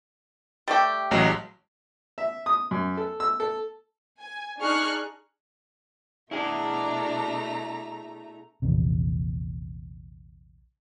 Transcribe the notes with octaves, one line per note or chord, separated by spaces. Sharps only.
G3 A3 G4
A1 F#3 G#3
E5
D#6
F#2
A4
E6
A4
G#5
D4 D#4 G#4 C#6 F6 F#6
B2 A3 D4 E4 G#4 A#5
A#1 E2 C3